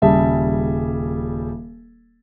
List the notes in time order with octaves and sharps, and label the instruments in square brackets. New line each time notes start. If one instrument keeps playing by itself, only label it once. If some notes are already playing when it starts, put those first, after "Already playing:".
[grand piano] D#1 C#3 G3 G#4 E5 A5